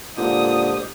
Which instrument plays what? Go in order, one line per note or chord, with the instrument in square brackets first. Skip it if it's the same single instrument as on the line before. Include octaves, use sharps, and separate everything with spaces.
[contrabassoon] A#2 [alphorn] D3 [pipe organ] G#3 G4 C5 [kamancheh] D#6